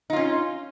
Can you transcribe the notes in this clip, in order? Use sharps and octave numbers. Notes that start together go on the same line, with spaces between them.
C#4 D#4 F4